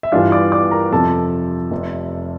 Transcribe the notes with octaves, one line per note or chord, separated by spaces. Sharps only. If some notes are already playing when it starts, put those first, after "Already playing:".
E5
G2 E3 G3 D4 F4 F5
D5 D6
D5 D6
A#4 A#5
F2 C3 F3 A4 A5
F1 F2 C3